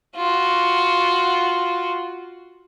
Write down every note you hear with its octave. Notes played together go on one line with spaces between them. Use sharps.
F4 F#4